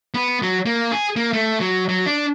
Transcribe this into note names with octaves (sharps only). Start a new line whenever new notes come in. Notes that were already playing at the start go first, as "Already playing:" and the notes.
B3
F#3
A#3
G#4
A#3
A3
F#3
F#3
D4